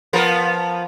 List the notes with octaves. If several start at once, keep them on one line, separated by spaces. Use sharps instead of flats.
F3 B3 A#4